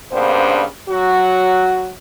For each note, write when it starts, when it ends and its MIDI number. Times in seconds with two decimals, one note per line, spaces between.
0.12 0.64 43
0.12 0.64 46
0.12 0.64 49
0.12 0.64 59
0.12 0.64 62
0.12 0.64 72
0.89 1.93 54
0.89 1.93 66